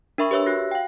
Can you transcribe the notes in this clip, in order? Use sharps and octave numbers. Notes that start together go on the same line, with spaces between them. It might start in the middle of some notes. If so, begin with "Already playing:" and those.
D4 A#4 E5 B5 C#6
G4 B4 C#5 E5 E6
F#4 F#6 A#6
F5 G5